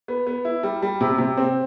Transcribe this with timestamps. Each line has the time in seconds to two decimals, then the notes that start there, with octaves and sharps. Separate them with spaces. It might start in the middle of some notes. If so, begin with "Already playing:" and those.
0.08 B3
0.27 B3
0.45 E4
0.63 G3
0.82 G3
1.01 C3
1.18 C3
1.37 C4